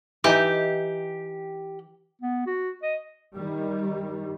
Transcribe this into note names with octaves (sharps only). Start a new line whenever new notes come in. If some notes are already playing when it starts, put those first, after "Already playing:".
E3 D#4 G4
B3
F#4
D#5
G2 D#3 G3